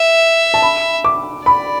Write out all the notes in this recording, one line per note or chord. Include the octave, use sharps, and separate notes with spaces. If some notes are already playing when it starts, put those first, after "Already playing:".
Already playing: E5
A5
B5
D6
D5 B5